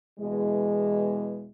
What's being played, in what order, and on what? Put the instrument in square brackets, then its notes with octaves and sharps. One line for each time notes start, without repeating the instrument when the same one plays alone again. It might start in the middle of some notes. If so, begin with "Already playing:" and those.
[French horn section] E2 B2 E3 G#3